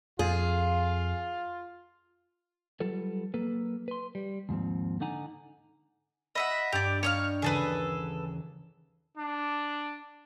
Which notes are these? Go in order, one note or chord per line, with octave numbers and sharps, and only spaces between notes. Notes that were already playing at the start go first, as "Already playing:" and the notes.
F2 F4 G#4
F#3 G3 F4 A4 B4
F#3 A#3 A4 B4
B4 C6
G3
D#2 G#2 F3 C4
D3 D4 D#4 F#5 G#5 A#5
D#5 E5 F#5 B5
G2 G4 D5
D4 D#4 G4 C#5 D#5 F5
D#2 C#3 E3 G#4 A4 B4
D4